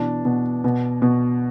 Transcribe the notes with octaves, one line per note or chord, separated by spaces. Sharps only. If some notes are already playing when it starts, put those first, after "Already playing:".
Already playing: B2 E3 D4
B2
B2
B2